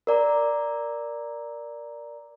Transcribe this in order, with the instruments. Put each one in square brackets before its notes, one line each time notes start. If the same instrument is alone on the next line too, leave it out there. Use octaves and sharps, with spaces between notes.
[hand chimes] A#4 D5 A#5